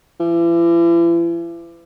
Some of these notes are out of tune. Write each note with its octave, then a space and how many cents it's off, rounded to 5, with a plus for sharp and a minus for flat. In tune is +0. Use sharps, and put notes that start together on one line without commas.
E3 +40